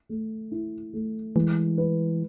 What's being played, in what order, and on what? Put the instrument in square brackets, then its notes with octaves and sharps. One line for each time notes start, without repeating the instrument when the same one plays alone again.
[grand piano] A3
E4
A3
[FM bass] E3 [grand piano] G#3
[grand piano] B4